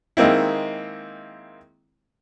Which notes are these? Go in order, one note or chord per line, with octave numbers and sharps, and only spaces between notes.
D#3 G#3 A#3 C4 E4